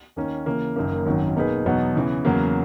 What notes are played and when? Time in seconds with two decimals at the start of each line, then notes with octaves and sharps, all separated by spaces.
0.16 D#2 D#3 A#3 C#4
0.46 C#3 E3 A#3
0.76 F#1 F#2 D#3 A#3
1.06 G#1 F#2 D#3 F#3
1.36 B2 A#3 D#4 G#4 B4
1.65 E2 B2 F#3 B3 D#4
1.95 C#3 E3 B3
2.25 E2 C#3 F#3 A#3